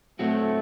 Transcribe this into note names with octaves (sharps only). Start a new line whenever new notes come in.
A2 F#3 A3 C4 F#4